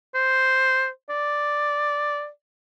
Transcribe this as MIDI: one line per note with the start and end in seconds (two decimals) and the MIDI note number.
0.15 0.88 72
1.09 2.28 74